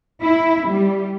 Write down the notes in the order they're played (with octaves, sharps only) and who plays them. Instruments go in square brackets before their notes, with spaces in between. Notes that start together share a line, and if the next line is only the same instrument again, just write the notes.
[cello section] E4
G3